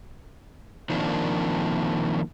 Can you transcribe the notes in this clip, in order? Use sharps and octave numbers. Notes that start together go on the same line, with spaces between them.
D#3 F3 A#3 C4 D4